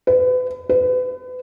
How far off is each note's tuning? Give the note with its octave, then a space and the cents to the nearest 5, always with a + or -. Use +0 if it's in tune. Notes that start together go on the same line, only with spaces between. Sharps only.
B4 +35
B4 +35